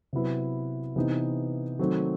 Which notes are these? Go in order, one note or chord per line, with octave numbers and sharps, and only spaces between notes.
C3 F#3 B3 E4 B4
C3 E3 B3 D#4
D#3 F#3 A3 C4 D#4